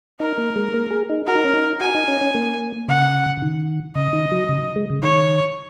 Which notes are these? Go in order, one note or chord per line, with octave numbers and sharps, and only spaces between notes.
D#4 A#4
A#3
G#3
A#3
G#4
D#4
F#4 A#4
D#4
C#4
D#4
F#4 G#5
D#4
C#4
C#4
A#3
C#3 F#5
C#3
D#3
C#3 D#5
D#3
F#3
C#3
G#3
C#3
D#3 C#5